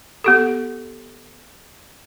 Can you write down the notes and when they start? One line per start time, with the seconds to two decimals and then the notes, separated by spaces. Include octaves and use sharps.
0.24 B3 G4 A4